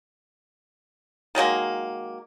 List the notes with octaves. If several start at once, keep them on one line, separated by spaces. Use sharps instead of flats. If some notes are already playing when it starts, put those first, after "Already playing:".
D#3 F#3 G#3 A#3